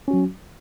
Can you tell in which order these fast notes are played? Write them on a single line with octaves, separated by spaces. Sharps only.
C#4 F#4 F#3